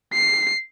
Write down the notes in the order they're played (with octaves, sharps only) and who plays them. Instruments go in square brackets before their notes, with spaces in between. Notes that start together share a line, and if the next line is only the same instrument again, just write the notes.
[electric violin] C7